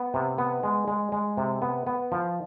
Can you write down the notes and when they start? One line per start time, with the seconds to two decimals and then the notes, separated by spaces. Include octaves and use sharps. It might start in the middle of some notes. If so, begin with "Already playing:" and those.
Already playing: B3
0.14 C3
0.38 B3
0.63 G#3
0.88 G#3
1.12 G#3
1.37 C3
1.62 B3
1.87 B3
2.12 F3